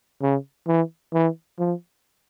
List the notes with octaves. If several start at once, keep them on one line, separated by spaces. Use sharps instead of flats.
C#3
E3
E3
F3